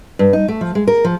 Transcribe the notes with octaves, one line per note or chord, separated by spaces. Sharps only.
G2
D#4
A3
F3
G#3
A#4
F3